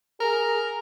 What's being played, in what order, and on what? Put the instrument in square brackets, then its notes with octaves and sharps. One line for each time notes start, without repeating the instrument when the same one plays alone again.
[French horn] G#4 [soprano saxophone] A#4